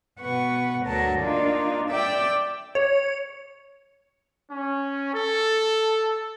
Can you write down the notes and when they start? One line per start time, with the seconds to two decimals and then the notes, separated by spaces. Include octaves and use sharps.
0.19 B2 B4 F#5 C#6
0.85 D2 F#3 A#4 A5
1.19 A#3 D4 D#4 F4
1.90 D5 E5 G5 D6 E6
2.75 C#5
4.50 C#4
5.14 A4